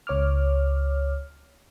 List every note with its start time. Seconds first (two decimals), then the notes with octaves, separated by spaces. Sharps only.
0.07 C#2 C#5 D6 F6